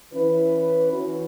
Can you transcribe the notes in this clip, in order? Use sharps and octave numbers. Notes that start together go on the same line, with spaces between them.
E3 C#4 B4
E3 C#4 F#4